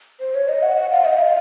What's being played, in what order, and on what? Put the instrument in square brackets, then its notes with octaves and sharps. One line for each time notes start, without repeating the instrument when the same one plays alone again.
[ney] C5
C#5
D#5
F#5
F#5
F5
D#5
F5